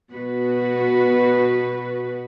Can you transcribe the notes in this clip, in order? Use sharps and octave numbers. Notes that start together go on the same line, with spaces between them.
B2 F#4 B4